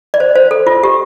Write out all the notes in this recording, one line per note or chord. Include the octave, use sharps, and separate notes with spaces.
D5
C5
C5
A4
F4
G4